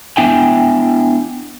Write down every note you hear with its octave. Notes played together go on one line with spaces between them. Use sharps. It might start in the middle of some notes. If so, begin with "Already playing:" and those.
B3 D4 E4 E5 G5 G#5